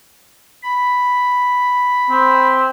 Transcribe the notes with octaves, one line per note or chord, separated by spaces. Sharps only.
B5
C4